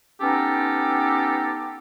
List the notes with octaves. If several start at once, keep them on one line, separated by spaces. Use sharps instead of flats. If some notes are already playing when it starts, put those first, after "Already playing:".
B3 C#4 D#4 G4 A4 G5